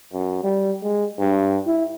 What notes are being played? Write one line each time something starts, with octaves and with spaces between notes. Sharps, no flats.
F#2
G3
G#3
G2
E4